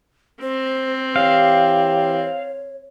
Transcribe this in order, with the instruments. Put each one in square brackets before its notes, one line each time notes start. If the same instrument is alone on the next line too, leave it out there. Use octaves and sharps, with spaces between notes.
[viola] C4 [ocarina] C5
[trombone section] E3 G4 [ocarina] C#5 [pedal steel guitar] F5